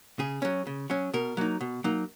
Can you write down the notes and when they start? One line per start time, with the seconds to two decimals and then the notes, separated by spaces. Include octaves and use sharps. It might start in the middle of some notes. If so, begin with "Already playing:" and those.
0.19 C#3 G#4
0.42 F#3 C#4
0.67 C#3
0.90 F#3 C#4
1.13 B2 A#4
1.37 F#3 A#3 D#4
1.61 B2
1.84 F#3 A#3 D#4